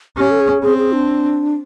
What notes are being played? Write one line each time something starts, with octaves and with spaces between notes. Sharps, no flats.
C#4 G4
A4
G#4
C4 G#4
G#4
D4